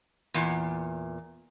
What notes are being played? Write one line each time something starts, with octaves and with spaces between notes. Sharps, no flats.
E2 A#2